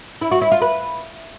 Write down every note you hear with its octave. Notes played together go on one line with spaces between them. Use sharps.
E4
F#4
E4
F4
B4